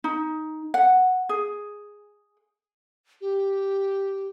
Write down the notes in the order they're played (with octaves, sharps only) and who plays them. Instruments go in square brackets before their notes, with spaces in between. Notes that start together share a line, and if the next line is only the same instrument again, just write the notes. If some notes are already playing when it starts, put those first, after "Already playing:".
[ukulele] D#4
F#5
G#4
[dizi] G4